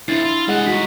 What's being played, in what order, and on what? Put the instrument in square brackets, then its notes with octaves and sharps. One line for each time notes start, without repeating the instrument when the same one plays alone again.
[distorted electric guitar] F2 F4 [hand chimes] D4 A6 C7 [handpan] E4
[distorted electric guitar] F4
[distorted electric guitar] G3 D#5 [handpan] G#3 G#4 F#5
[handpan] D#4 F#4 [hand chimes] B6